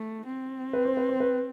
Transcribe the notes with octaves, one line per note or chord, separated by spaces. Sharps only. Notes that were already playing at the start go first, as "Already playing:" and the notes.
Already playing: A3
C4
B4
C5
B4
C5
B4